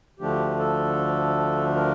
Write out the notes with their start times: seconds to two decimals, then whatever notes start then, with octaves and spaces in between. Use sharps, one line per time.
0.19 D2 D3 F3 A3 D4 G4
0.59 A4
1.76 A#4